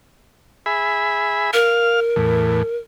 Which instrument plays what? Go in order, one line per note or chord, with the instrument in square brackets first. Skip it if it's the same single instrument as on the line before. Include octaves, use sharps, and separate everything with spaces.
[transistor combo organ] G#4 E5 B5
[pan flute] A#4 [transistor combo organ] F5 F6
[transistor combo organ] E2 A2